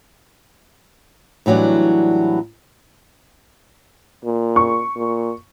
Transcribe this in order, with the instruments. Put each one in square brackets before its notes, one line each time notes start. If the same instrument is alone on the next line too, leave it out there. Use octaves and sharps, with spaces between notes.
[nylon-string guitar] A2 E3 F#3 G3 D4
[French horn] A#2
[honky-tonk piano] C#6
[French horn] A#2